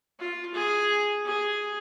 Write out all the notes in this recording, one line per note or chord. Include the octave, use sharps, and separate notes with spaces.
F4
G#4
G#4